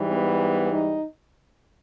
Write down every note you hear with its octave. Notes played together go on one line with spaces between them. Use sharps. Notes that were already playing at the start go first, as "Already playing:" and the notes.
Already playing: G#2 E3 G3
B3
D#4